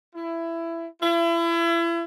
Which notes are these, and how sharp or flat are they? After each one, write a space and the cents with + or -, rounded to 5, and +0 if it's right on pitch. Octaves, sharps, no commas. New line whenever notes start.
E4 +15
E4 +35